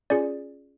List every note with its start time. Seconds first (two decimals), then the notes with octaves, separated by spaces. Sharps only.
0.10 C#4 F4 G#4 D5